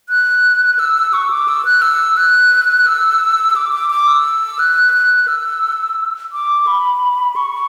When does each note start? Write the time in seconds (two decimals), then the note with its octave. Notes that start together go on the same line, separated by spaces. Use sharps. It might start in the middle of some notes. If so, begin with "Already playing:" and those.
0.09 F#6
0.79 E6
1.13 C#6
1.30 D6
1.48 E6
1.65 F#6
1.82 E6
2.17 F#6
2.86 E6
3.56 D6
3.73 D6
3.90 D6
4.07 E6
4.59 F#6
4.94 F#6
5.28 E6
6.33 D6
6.67 B5
7.36 C#6